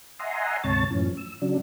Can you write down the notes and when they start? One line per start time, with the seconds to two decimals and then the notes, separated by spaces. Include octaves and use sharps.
0.19 D#5 E5 F#5 G#5 A#5 C6
0.64 D2 G#2 C3 C#5 A5 A6
0.91 F#2 A2 E3 F3 C#4
1.17 E6
1.42 C#3 F#3 D4